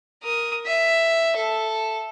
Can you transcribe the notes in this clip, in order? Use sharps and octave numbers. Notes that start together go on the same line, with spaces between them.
A#4 D#6
E5
A4